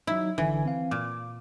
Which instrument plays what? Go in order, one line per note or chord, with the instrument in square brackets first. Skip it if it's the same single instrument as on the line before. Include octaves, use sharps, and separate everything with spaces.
[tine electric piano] F#3 D#4 [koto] E4
[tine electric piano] G#1 D3 G#5 [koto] E3
[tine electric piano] C4 F5
[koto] A#2 [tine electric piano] D6